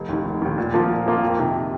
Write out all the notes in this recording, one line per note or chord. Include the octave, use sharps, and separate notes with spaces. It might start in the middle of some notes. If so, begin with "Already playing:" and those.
Already playing: F1
D#2 D#3
F1
D#2 D#3
A#2
F3 A#3 F4
A#2
F3 A#3 F4
F2
C3 D#3